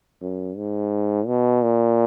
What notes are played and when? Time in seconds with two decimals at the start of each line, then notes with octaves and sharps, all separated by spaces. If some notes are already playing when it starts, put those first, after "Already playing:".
0.21 F#2
0.56 G#2
1.27 B2
1.63 A#2